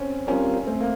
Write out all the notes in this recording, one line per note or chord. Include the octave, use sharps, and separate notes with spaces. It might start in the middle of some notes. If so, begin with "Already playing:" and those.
Already playing: C4 C#4
G3 C4 C#4 F4 A#4
A3 C4
A#3